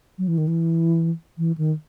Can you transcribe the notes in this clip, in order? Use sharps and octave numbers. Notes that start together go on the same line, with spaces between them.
F#3
E3
D#3
E3
E3
D#3